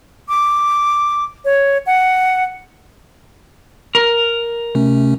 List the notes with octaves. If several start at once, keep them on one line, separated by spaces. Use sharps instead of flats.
D6
C#5
F#5
A#4
C3 A3 C#4